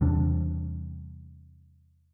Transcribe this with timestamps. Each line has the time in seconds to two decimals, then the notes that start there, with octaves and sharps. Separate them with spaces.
0.01 E2 C3 G3 D4